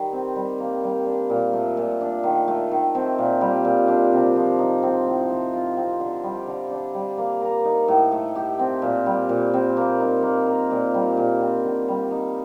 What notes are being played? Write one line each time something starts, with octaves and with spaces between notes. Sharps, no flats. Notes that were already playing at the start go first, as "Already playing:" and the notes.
Already playing: D#3 G3
C4
G3
A#3
G3
D4
A#2
A3
A#2
D4
D#3
A3
D#3
C4
A#2
G3
A#2
D4
C3
F3
D#4
C4
A2
A3
F4
C4
D3
G3
D3
D4
G3
A#3
A#4
D#4
A2
A3
G4
C4
A#2
G3
A#2
C4
A#3
D#4
A#3
A#4
A#2
G3
A#2
C4
D3
G3
D#4